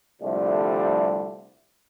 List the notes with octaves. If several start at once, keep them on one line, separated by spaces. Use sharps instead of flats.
C2 D3 F3 G3 A3